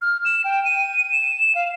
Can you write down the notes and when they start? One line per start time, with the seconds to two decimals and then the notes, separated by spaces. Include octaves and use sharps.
0.02 F6
0.25 E7
0.44 G5
0.65 D#7
1.12 E7
1.55 F5